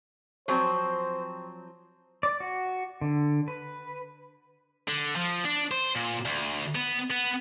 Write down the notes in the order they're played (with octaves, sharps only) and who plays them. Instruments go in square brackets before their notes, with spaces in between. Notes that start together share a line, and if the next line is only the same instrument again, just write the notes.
[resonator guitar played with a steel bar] F3 F#3 C4 [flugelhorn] C5
[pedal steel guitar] D5
F#4
D3
B4
[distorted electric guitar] D3
F3
D4
C5
A#2
D2
B3
B3